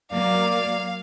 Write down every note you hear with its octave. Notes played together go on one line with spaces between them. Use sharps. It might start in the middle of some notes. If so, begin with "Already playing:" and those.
F#3 A#3 D5 F5